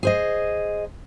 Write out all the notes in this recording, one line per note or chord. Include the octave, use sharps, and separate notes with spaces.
G#4 C5 D#5